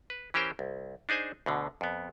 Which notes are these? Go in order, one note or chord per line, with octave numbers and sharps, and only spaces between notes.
B4
E3 C#4 G4 A#4 C5 G5
C2
D4 D#4 G#4 C5 G#5
D2 B2 D3
F2 B3